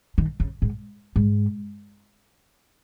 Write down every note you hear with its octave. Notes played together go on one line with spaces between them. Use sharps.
D#3
C#3
G#2
G#2